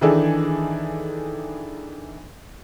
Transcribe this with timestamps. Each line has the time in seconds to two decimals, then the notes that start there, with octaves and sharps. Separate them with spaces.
0.01 D#3 E3 D4 D#4 G#4 A4